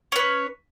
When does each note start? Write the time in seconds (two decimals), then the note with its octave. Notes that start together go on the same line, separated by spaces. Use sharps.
0.12 C#4
0.16 B4
0.19 C#5